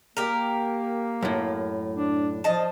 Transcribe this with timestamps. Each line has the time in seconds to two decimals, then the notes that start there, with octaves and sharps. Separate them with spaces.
0.17 A#3 G4 A#4
1.22 F#2 A2
1.96 D4
2.44 F3 D#5 A5